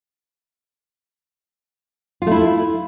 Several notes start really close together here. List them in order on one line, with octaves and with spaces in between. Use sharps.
F4 A3 E4